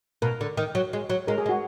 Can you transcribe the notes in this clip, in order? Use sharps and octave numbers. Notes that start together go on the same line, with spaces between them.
B2 A#4
D3
D#3
F#3
G#3
F#3
G#3 A#4
G#4
G#3
F#4